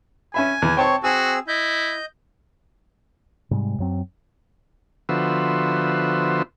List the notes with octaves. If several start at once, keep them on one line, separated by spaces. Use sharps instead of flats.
C#4 E5 G#5 B5
E2
C4 C#5 G5 A5 C#6
C4 F#4 G#4 G#5 E6
E4 D#5 G6
G#2 C3 G3 G#3
F#2 F#3 C4
D3 F3 B3 F#4 C5 E5